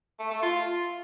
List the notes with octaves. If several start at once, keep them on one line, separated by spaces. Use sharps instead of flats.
A3
A3
F4